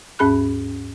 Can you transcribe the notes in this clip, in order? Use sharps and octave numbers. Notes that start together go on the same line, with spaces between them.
D#2 G#2 C#4 G#4 B5 F#6